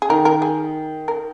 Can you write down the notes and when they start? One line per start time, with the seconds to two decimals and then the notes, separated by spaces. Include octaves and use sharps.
0.02 G#4
0.09 D#3 A#4
0.25 A#4
0.42 G#4
1.08 A#4